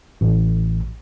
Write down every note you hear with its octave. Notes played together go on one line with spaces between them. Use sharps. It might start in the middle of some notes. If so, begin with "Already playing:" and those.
A1